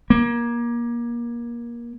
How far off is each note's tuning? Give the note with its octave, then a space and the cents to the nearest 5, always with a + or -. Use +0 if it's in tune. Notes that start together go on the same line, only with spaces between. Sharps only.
A#3 +25